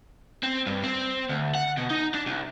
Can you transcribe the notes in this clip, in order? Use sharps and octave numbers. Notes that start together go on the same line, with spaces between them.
C4
G2
C4
D2
F#5
B2
D#4
D4
C2